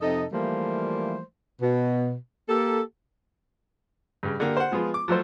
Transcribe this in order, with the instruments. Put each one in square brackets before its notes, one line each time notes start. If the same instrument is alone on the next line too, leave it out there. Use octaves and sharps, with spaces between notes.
[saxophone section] F2 C3 D#4 A4 D#5
E3 F3 G3 A3 A#3 C5
B2
A#3 G4 A4
[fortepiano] G2 C#3
D3 A#3 G4
C5 F#5
F3 G#3 B3 F4
D6
F3 F#3 A3 C5